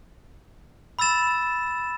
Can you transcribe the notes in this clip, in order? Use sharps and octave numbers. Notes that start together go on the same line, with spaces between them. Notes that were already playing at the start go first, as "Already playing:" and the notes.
B5 E6 A6 E7